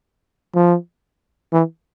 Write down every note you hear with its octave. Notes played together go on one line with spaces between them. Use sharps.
F3
E3